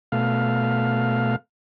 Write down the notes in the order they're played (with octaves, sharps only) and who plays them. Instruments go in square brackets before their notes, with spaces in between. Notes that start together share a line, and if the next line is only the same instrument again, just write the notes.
[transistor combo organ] B2 A3 F5